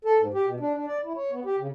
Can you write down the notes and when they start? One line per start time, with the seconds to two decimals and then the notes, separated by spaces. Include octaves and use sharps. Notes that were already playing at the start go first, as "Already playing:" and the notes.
0.05 A4
0.19 G#2
0.34 G4
0.46 B2
0.60 D4
0.74 D4
0.87 D5
1.04 E4
1.16 C#5
1.32 B3
1.45 G4
1.58 C#3